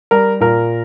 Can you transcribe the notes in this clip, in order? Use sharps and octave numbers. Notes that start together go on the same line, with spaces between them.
G3 A#4
A#2 A#4